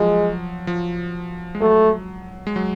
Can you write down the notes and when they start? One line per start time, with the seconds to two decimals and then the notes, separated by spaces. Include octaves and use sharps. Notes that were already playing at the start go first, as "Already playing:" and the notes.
Already playing: F3 F#3 G#3
0.67 F3
1.55 G#3
1.61 F#3 A3
2.47 G#3
2.56 F#3